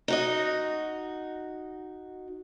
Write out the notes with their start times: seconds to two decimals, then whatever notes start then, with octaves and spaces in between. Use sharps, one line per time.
0.08 D#4 F#4 D#5